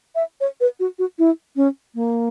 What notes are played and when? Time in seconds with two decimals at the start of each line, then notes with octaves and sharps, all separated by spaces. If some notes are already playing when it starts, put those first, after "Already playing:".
0.15 E5
0.41 C#5
0.61 B4
0.80 F#4
0.99 F#4
1.19 E4
1.56 C#4
1.95 A#3